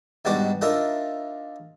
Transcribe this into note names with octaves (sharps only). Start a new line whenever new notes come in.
G#2 B2 G3 D4 F#4 D6
D4 D#4 F4 A#4 E5